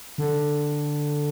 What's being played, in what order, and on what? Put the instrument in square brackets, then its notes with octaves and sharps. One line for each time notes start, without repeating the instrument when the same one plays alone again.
[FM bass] D3